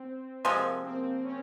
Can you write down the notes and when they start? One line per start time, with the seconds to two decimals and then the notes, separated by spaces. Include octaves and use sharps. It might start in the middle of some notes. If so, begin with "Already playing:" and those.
Already playing: C4
0.44 C3 F3 G#3 A#3
0.84 C4
1.23 C#4